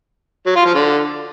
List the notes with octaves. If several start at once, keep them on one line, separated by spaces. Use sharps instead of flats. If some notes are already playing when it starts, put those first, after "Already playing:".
F#3
F4
F3
D3